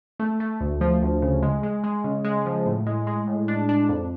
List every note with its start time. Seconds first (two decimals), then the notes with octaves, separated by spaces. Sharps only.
0.20 A3
0.40 A3
0.60 D2
0.81 F3
1.02 D2
1.22 C#3
1.42 G#3
1.63 G#3
1.84 G#3
2.04 C#3
2.25 G#3
2.46 F3
2.66 A2
2.87 G#3
3.07 G#3
3.27 A2
3.48 D4
3.69 D4
3.89 F2